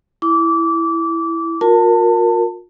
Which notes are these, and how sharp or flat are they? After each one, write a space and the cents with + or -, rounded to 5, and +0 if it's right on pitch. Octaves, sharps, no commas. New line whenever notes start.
E4 +0 D6 -25
F4 +45 A#4 +0 A5 +25